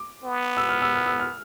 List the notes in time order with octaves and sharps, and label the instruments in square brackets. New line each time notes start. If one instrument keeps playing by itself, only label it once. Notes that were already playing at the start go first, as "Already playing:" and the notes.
Already playing: [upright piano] D6
[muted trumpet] B3
[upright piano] E6
F6
E6
F6
E6
F6